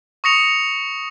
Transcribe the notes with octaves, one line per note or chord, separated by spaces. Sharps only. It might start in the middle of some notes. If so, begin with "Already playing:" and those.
C#6 D#6 A#6 C#7 F7